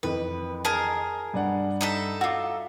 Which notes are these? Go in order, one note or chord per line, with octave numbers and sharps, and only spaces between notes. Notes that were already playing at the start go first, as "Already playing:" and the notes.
F2 D#3 E3 B4
G#4 A#4 A5
G2 D5 F#5
D#4 A4 E5
F4 F#4 D6 E6